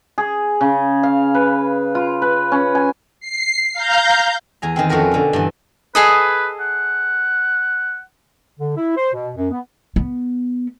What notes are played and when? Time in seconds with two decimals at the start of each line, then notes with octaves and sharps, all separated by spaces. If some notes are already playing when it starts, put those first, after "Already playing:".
0.18 G#4
0.61 C#3
1.03 F5
1.34 B4
1.95 F4
2.22 B4
2.52 C#4
2.75 G#5
3.20 C7
3.73 F5 A#5 G6
4.62 E2 G#5 A#5
4.76 D#3 E3 C4
4.89 F2 C#4 F#4 A#4 B4
5.11 B2 D3
5.33 G2 E3
5.95 G#4 A4 B4 D#5
6.60 F#5
8.60 D3
8.77 E4
8.97 C5
9.14 B2
9.36 F#2
9.51 B3
9.96 B3